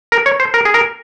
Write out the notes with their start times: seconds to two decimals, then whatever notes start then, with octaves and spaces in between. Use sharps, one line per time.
0.12 A#4
0.26 C#5
0.40 C5
0.54 A#4
0.65 G#4
0.74 A#4